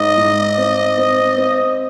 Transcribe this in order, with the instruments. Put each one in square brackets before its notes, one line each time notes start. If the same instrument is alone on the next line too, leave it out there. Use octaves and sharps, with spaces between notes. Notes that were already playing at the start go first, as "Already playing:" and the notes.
Already playing: [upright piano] G#2 [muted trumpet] D#5
[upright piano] G#2
C4
C4
C4